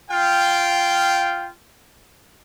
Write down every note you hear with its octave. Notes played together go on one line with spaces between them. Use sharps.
F4 F5 G5